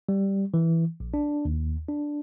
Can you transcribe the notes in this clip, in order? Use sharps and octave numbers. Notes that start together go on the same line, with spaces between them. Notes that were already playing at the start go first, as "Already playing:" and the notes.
G3
E3
A#1
D4
D#2
D4